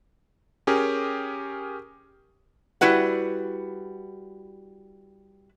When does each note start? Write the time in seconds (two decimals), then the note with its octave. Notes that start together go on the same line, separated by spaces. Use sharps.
0.67 C#4 G4 G#4 A#4
2.81 G3 E4 F#4 B4 F#5